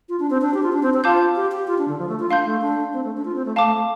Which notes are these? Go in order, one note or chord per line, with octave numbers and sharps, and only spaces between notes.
F4
D4
C4
D4
G4
F4
D4
C4
C4
F4 F5 A5 D6 G6
G4
G4
F4
D4
D3
F3
A3
F4
D4 F5 C6 G6
A3
D4
C4
A3
D4
F4
C4
A3
A3 F5 A5 D6